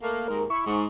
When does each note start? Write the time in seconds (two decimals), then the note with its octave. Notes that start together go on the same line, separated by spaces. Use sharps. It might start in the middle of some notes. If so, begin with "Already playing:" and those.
0.01 A3 A#3
0.28 D#2 G#2 A#4
0.50 E4 C#6
0.65 G#2